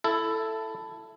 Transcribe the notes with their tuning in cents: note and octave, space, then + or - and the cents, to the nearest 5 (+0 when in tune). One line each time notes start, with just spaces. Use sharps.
E4 +15 A4 +0